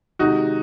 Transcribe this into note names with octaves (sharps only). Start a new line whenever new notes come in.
C3 D#3 G#3 D#4 F#4